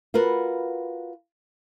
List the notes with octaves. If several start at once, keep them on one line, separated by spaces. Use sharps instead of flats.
F4 F#4 A#4 B4